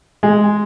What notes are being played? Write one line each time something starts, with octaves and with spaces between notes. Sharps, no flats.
G#3